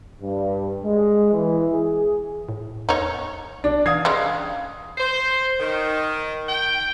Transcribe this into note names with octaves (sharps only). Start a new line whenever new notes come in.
G2
G#3
E3
G#4
A2
E2 D#4 C#5
B1 D4
E3 F5 D#6 G#6 C7
C#3 G3 G#3
C5
D#3
G5